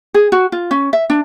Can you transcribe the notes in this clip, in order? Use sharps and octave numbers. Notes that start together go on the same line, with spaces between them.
G#4
F#4
F4
C#4
E5
D4